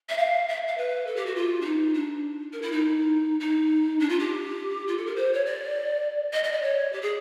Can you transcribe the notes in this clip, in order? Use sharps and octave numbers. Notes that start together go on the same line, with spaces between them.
E5
F5
E5
F5
B4
A4
G4
F#4
F4
D4
D#4
D4
A#4
E4
D#4
D#4
D4
F4
G4
F4
A4
A#4
C5
C#5
D5
D#5
D#5
D5
C#5
G4
G#4